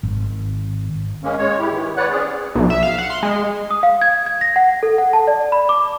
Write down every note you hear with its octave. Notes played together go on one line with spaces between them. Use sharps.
G#1
G#3 A#3 C#4
G#3 C#5
E4 G4
D#3 E3
B4 C#5 D5 F#5 F#6
C4 C#4 G#4 D5
B1
E5
F5
F#5
C6
G#3
D#6
F5
G#6
G#6
A#6
F#5
A4
F#5
A5
D5
B5
D6